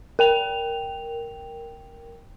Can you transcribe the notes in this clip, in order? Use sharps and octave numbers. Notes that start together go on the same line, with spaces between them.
A#4 G5 F7